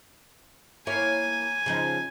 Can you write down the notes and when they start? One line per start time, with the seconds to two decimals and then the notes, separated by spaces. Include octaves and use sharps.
0.87 A#3 E4 C#5 G#5
1.66 C#3 F3 D#4